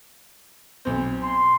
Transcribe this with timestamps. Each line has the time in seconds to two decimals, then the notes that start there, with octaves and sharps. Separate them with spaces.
0.85 B1 C4
1.22 C6